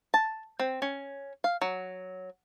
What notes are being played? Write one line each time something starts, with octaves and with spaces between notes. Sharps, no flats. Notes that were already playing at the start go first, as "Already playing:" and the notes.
A5
C4
C#4
F5
F#3